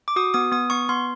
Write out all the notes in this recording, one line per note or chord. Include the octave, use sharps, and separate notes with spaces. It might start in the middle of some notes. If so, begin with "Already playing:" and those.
D6
F#4 D#6
B3 D#6
B3 D#6
B3 C#6
B3 C6